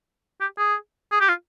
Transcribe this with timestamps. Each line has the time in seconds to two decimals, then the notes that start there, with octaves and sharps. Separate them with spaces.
0.41 G4
0.58 G#4
1.11 G#4
1.20 G4
1.29 F4